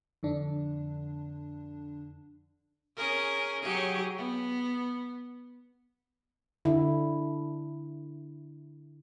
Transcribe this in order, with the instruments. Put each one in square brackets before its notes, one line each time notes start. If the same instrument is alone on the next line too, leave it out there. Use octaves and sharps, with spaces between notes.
[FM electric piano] F2 D3 D4
[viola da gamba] C#4 G#4 A#4
F#3 G4 G#4
B3
[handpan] D3 E4